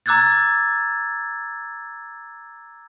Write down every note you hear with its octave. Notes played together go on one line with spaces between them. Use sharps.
A#5 D6 E6 F#6 G#6 A6